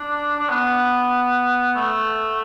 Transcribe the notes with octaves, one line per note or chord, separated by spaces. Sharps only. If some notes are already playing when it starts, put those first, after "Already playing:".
Already playing: D4
D4
B3
A3